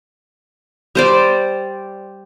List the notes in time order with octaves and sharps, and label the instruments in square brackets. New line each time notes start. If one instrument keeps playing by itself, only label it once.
[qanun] G3 C5 D5